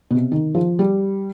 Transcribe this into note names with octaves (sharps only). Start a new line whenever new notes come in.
B2
C3
D#3
F3
G3